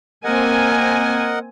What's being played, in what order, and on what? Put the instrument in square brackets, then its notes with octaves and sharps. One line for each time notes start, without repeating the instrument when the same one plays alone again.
[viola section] A#3 C4 G#5 [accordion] A#4 D#5 F#5